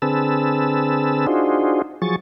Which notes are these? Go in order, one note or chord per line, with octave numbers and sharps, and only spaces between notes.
D3 C4 G#4 B4 A5 E6
D4 D#4 F4 F#4 G#4 C5
F3 F#3 G#4 C#6 A6